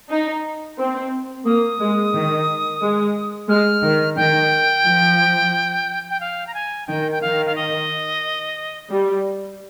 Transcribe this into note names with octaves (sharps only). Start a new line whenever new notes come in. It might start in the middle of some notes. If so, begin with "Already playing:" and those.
D#4
C4
A#3 D#6
G#3
D#3
G#3
G#3 F6
D#3
D#3 G5
F3
G5
F5
A#5
G#5
D#3 G5
G5
D#3 F5
F5
D#5
G3